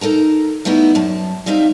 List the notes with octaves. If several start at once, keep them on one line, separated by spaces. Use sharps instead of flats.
D#4 A4 A#4 A#5
G3 A3 B3 D#4 E4
F#2 A5
G3 C4 D#4 E5 F5